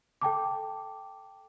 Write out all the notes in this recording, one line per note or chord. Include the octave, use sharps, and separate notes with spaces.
A4 G5 A5 D6